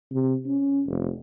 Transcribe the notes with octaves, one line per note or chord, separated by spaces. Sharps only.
C3
C#4
F1